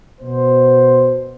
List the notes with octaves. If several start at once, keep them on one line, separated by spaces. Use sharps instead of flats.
B2 C5